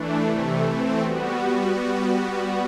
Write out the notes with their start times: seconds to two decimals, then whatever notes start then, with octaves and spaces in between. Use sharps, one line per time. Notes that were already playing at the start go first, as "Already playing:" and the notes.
Already playing: E3 A3 D4
0.24 C3 E3 A3
0.63 E3 A3 C4
1.01 G3 B3 F#4